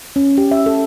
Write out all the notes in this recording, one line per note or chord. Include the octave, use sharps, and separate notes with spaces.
C#4
G4
E5
A4